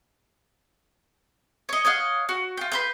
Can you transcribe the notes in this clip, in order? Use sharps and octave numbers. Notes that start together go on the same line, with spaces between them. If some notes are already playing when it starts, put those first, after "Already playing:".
C#5 D#5
C#5 D#5 F5 F#5
F#4
F4 G5
B4 C6 G6